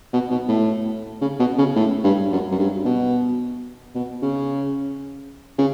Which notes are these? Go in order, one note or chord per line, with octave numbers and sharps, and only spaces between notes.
B2
B2
A2
C#3
B2
C#3
A2
G2
F#2
F#2
G2
B2
B2
C#3
C#3